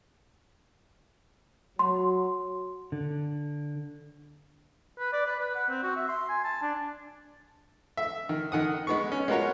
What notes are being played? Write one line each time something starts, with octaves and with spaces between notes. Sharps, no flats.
F#3 C6
D3
B4
D5
B4
B4
F#5
C4
F#4
E5
C6
G#5
A5
D4
E5
D#3
D#3 F#5 D#6
G#3 B3 C#6
C#4
G#3 B3 F4 F#4 A#4 C#5